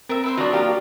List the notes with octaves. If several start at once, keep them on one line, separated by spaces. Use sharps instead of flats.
C4 A#4 E5
C5 E5 B5
F3 F#3 D4 F#4 D5 A#5
A#3 F4 G4